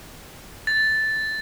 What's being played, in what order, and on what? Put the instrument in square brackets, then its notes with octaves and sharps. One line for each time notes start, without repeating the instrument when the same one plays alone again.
[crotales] A6